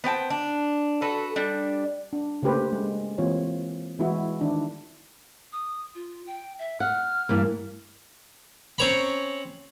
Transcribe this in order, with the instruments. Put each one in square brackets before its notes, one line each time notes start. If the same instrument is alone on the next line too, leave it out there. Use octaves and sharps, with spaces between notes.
[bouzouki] B3 C4 G5 A5
D4
F#4 A4 B4
G3 D4
[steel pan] D4
C#3 A3 A#3 G4 B4 C5
G#3
E3 A#3 C4 F4 G4 C#5
E3 G#3 B3 E4 F#4
D#3 D4 E4
[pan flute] D#6
F4
G5
E5
[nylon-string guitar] F#5 [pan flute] F6
[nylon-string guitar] G2 E3 A#3
[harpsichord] C4 C#4 C#5 A#5 B5